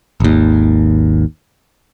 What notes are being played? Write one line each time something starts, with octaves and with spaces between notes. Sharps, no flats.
G#1 D#2